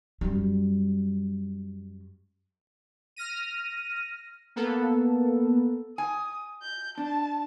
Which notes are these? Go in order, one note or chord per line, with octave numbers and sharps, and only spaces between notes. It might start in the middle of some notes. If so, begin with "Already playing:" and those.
F#2 G3
F6 A#6 D#7
A#3 B3 A4
G#5 D#6
G6
D4 A5